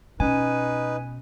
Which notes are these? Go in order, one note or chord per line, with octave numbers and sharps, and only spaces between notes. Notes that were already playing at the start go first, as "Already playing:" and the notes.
B2 C#4 D#4 B4 G#5